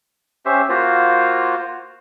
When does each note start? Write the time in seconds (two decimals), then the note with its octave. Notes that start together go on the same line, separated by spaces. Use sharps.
0.46 C#4 G4 C5 E5
0.69 A#3 F4 F#4 C5